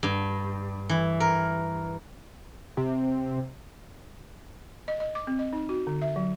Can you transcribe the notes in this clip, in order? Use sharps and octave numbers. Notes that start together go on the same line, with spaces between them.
G2
E3
A#4
C3
D#5
D#5
D6
C4
D#5
D#4
F#4
D3
E5
F#3